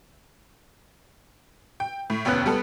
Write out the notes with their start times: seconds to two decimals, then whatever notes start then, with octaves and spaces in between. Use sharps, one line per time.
1.80 G5
2.10 A2
2.25 F1 D#2 B3 C#4 F#6
2.46 G3 B3 A4